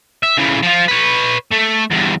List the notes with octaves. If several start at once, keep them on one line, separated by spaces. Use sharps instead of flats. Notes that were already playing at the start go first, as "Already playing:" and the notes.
E5
C#3 E3
F3 F4
B4 C#5
A3
E2 G2